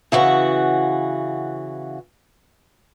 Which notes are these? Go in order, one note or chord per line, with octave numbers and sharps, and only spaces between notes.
C#3 E3 F#4 F#5